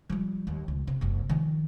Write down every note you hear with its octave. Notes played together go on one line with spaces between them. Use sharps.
F3 G3
D#2
C#2
C3
F#1 C2
D#3 F3